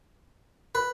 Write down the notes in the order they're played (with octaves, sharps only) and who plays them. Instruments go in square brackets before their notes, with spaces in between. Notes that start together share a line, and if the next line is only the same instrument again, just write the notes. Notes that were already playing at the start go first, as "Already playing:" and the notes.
[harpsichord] B4